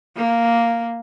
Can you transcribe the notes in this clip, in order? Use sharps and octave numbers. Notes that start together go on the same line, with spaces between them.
A#3